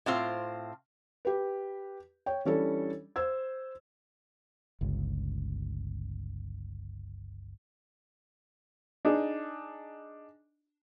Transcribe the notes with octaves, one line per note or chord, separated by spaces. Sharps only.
A2 C4 F4 C5
G4 B4
C#5 G5
E3 G3 C#4 D4 A4
C5 E6 G#6
G1 C#2
D4 D#4 G#4